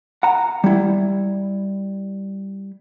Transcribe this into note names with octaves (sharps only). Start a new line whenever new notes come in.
F#5 A#5
G3 E4